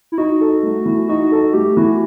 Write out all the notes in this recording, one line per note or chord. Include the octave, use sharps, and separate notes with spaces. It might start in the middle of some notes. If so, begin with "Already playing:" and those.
E4
D#4 F#4
A4
A3
E3
D#4 F#4
A4
A3 G4
E3 F#4